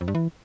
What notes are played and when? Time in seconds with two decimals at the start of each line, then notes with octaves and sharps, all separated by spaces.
0.01 F2
0.08 G2
0.15 E3